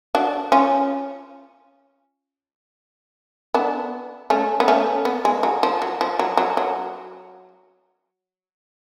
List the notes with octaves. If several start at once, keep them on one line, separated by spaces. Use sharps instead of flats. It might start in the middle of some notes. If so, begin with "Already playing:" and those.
D4 F#4
C#4 F4
B3 D4
A3 C#4
B3
A3 C#4
B3
G#3
F#3
F3
F#3
F3
F#3
F#3
F#3